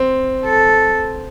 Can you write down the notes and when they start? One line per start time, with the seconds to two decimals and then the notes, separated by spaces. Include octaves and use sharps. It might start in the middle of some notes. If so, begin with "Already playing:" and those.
Already playing: C4
0.45 A4